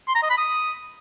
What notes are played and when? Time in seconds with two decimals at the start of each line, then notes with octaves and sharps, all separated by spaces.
0.08 C6
0.15 A#5
0.23 D#5
0.30 B5
0.38 D#6